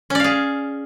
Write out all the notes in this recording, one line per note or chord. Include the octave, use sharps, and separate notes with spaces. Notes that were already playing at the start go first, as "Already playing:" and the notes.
C#4 G#4 D5 F5